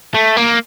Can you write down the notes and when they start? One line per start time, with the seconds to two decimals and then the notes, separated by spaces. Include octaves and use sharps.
0.15 A3
0.37 A#3